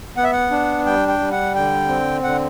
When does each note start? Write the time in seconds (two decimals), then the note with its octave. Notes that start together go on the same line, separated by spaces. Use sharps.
0.16 B3 F#5
0.24 E5
0.32 F#5
0.51 D4
0.86 G3 G5
1.08 G5
1.20 G3
1.32 F#5
1.55 D3 G5
1.88 C4
2.23 D3 F#5